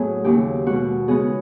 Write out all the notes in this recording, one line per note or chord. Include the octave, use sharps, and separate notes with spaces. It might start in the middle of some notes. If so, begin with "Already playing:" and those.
Already playing: A2 F#3 B3 G#4
D#2 C#3 F#3 A#3 G4
B2 G#3 B3 F#4
C#3 F3 G#3 B3 G#4